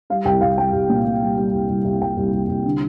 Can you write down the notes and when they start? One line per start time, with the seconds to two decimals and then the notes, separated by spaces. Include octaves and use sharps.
0.10 G3 F5
0.25 C2 G5
0.41 C2 F5
0.58 G3 G5
0.73 C2
0.89 A#2
1.06 A#2
1.22 G3
1.38 G3
1.53 C2
1.69 C2
1.85 C2
2.01 C2 G5
2.17 C2
2.32 C2
2.48 C2
2.65 D3